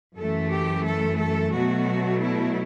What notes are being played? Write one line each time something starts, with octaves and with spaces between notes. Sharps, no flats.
F#2 E3 A3 A4
G4
A4
A4
B2 F#3 A3 F#4
E4